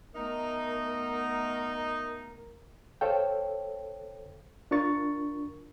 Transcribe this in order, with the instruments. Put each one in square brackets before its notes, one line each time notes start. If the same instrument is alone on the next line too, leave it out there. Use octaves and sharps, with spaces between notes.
[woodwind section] A3 B3 A#4 [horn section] D#4
[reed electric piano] A4 C5 C#5 F5 G5
D4 F4 A#4 C#6 A6